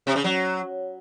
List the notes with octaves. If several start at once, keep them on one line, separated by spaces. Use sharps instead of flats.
C3
C#3
F#3